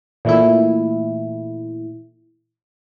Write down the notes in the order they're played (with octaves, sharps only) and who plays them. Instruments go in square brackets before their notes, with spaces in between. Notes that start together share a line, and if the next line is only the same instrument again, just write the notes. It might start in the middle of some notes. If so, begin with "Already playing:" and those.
[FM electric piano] A#2 E3 A3 E4